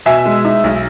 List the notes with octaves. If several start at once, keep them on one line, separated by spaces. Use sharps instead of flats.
B2 E5 G#5
G#3
D#4
B1